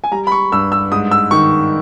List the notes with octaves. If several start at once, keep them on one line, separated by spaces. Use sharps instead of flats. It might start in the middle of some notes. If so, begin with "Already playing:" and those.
G#5
G3 A#5
B5
C#6
G2 E6
E6
G#2 D#6
E6
D#3 C#6